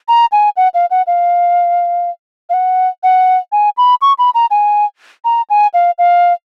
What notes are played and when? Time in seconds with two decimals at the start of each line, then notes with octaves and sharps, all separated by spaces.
0.08 A#5
0.32 G#5
0.57 F#5
0.74 F5
0.91 F#5
1.07 F5
2.50 F5
2.54 F#5
3.03 F#5
3.52 G#5
3.77 B5
4.02 C#6
4.18 B5
4.34 A#5
4.51 G#5
5.25 A#5
5.50 G#5
5.74 F5
5.98 F5